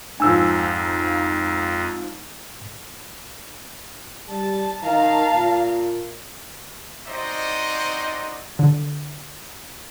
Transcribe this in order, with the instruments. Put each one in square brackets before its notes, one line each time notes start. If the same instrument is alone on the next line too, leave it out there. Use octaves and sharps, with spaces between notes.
[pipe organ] F2 [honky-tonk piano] G#2 F3 [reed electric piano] G#5 E6
[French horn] G3 [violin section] A5
[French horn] D#3 [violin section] F5 A5 A#5
[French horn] A#2
[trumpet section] C4 D#4 F#4 C5 D5 D#5
[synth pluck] D3